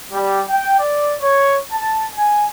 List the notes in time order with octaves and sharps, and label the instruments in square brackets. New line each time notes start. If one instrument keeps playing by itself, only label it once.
[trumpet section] G3
G5
D5
C#5
A5
G#5